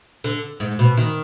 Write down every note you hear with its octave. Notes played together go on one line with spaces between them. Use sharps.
D3
G#2
B2
D#3